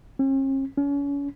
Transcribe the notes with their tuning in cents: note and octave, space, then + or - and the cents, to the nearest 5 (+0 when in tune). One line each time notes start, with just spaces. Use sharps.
C#4 -45
C#4 +35